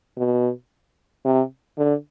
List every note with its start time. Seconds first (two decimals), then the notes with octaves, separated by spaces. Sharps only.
0.17 B2
1.25 C3
1.78 D3